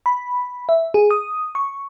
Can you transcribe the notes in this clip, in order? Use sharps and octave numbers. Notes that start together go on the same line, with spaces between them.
B5
E5
G#4
D#6
C#6